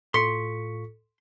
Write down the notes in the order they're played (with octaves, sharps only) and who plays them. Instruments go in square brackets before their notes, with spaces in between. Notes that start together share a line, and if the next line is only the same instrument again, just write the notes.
[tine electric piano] A2 F4 C#6 [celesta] A4 B6 C#7 [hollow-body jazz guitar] C6